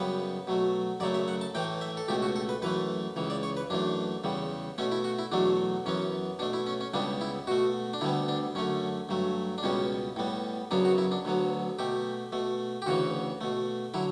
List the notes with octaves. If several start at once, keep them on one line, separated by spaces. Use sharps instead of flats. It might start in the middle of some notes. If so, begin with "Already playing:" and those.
Already playing: F#2 C#3 G3 B3 B4
B2 F#3 A3
F#2 C#3 F#3 A3 D5
E5
F#5
A5
A2 E3 A3 G5
E5
A4
C#2 B2 A3 G4
F#4
A4
B4
F#2 E3 A3 B4
C#2 C#3 E3
D5
C#5
B4
F#2 E3 A3 D4
E2 C#3 G3
B2 A3 C#4
E4
F#4
E4
E2 B2 F#3 A3 D4
F#2 E3 B3 C#4
B2 A3 D4
E4
C#4
C#4
C#2 C#3 G3 B3 D4
E4
B2 A3 F#4
D4
D2 D3 G3 B3 E4
D4
F#2 D3 A3 C#4
G2 F#3 A3
D4
C#2 B2 G3 B3 C#4
A2 G3 B3
F#2 C#3 F#3 B3 D4
F#4
E4
D4
D2 D3 F#3 B3
B2 A3 G4
B2 A3
G4
D2 C#3 E3 F#4
B2 A3
D3 F#3 E4